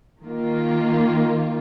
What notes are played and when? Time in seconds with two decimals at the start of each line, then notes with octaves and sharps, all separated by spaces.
0.24 D#3 A#3 F4